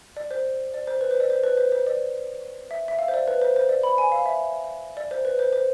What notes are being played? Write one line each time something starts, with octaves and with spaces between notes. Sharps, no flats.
D5
C5
D5
C5
B4
C5
D5
C5
B4
C5
C5
D5
E5
E5
F5
C5
D5
B4
C5
C5
D5
B5
G#5
F5
E5
D5
C5
B4
C5
C5